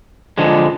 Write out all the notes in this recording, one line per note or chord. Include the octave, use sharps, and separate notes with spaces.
D3 F3 G#3